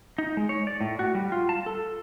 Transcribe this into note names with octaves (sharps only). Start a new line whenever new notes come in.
D#4
G#3
C#5
D5
A2
F#4
G3
F4
A5
A4